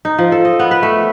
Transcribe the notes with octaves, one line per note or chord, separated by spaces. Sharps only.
D#4
F3
A4
D#5
B3
B4
A3